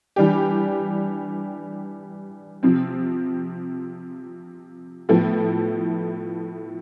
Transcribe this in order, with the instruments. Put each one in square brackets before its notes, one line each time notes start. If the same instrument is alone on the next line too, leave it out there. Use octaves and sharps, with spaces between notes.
[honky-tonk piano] E3 G3 D4 G4
C3 F3 C4
A2 F3 B3 E4 A4